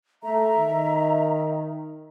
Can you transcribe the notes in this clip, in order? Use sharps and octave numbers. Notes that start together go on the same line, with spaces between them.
A3 E5 A#5
D#3